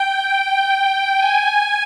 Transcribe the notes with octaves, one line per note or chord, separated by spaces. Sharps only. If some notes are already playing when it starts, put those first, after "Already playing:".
Already playing: G5
G#5